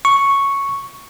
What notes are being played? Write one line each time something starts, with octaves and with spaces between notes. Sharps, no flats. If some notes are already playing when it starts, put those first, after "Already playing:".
C#6